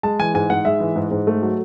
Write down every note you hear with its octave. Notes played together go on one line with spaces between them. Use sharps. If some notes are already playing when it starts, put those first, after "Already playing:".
G#3 A5
E3 G#5
G#2 G#5
G#2 F#5
G#3 E5
E3
G#2
G#2
A3
F#3